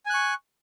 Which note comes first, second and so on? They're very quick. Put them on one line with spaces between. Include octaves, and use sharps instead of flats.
G#5 F#6 C#6